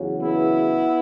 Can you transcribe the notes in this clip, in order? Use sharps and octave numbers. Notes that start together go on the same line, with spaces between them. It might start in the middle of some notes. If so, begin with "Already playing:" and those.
Already playing: E2 C#3 F#3
B3 E4